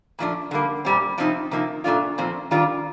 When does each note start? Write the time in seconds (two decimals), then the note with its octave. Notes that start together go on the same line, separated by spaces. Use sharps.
0.19 A#2 F3 A3 D4
0.51 D3 G3 A#3
0.85 A#2 G3 C4
1.18 C3 F3 C4 D#4
1.51 C3 F3 A#3 D#4
1.84 A#2 A3 D4 F4
2.18 A#2 F3 C4
2.51 D#3 G3 D4 F4